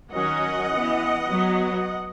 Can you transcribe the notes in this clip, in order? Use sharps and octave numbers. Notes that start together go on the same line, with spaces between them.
D#3 F#3 C#4 D#5 F#5
E3 B3
F#3 B3